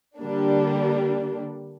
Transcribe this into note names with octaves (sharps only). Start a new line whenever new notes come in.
D3 G3 A#3 D4